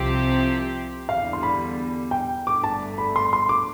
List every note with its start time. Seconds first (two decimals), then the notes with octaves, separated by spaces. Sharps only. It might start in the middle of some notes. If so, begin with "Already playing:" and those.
Already playing: C2 C3 F3 C4 G4
1.09 E2 D3 G3 F5
1.33 C6
1.43 B5
2.11 G5
2.46 G1 G2 D3 A3 D6
2.64 A5
2.98 B5
3.16 C6
3.33 C6
3.49 D6